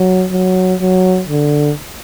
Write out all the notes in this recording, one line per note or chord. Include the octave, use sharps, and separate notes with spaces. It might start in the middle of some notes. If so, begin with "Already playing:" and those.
Already playing: F#3
F#3
F#3
D3